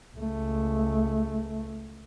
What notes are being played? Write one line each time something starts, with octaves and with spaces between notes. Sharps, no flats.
C#2 A3